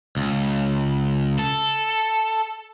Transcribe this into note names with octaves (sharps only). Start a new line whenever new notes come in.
C#2
A4